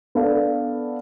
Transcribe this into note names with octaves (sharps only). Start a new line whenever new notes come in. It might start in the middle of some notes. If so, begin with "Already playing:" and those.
B3 D4 A4 F5